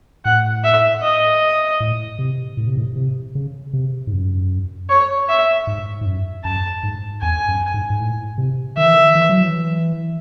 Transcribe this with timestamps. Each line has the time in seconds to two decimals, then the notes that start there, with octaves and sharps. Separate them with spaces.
0.25 A2 F#5
0.63 E5
1.02 D#5
1.80 A2
2.19 C3
2.57 A2
2.67 C3
2.77 A2
2.96 C3
3.35 C#3
3.73 C3
4.07 G#2
4.12 F#2
4.90 C#5
5.28 E5
5.67 G#2
6.01 G#2
6.06 F#2
6.44 F#2 A5
6.83 G#2
7.22 E2 G#5
7.48 F#2
7.74 G#2
7.90 G#2
7.99 A2
8.38 C3
8.77 D#3 E5
8.86 E3
8.95 D#3
9.15 E3
9.29 F#3
9.43 E3